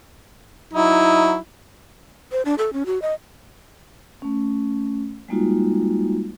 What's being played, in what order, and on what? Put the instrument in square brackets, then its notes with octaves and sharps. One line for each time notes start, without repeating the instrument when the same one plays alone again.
[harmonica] F#3 D#4 E4
[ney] C5
D4
A4
C#4
F#4
D#5
[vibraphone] A3 C#4
G3 G#3 A#3 D#4 F4 F#4